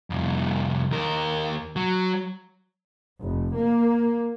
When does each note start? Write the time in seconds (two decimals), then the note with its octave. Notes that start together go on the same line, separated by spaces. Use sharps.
0.10 C2 F2
0.91 D#2 A#4
1.76 F#3
3.22 F1
3.57 A#3